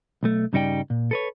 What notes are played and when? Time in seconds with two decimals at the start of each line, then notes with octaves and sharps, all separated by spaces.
0.23 B1 A3
0.53 G2 C#3 G3 D#4 D5 G5
0.90 A#2
1.11 A4 B4 C#5